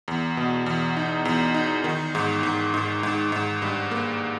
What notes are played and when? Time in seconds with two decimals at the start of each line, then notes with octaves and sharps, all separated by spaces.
0.08 E2
0.37 B2
0.66 E2
0.96 D#4
1.25 E2
1.54 D#4
1.84 D#3
2.15 G#2
2.43 G#2
2.74 G#2
3.03 G#2
3.32 G#2
3.62 G2
3.91 A#3